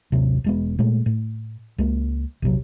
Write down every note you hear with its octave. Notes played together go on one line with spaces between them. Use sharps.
A1 D#2 C3 F#3
E1 G#3 B3
A#2 G#3 A3
A2
C#2 G#3 A#3
A#1 E2 C3 F#3